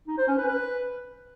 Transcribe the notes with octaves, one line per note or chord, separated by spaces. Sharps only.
D#4
C5
C#4
B4
B4